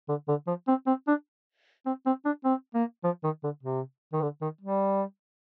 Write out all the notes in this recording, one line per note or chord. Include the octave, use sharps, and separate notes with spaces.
D3
D3
F3
C4
C4
D4
C4
C4
D4
C4
A#3
F3
D#3
D3
C3
D#3
D3
D#3
G3